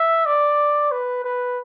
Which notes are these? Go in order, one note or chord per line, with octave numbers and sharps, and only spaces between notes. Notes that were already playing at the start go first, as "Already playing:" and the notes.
Already playing: E5
D5
B4
B4